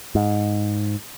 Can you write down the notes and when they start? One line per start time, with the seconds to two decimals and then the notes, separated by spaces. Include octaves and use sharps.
0.15 G#2